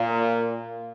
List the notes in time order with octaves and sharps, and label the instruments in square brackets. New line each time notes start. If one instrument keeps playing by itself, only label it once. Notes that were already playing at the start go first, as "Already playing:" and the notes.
Already playing: [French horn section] A#2